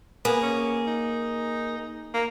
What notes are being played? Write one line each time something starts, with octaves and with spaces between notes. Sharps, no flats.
A#3 B3 G#4
C#4
D#4
A#3